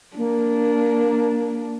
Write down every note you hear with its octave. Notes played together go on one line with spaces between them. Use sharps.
A#3 D4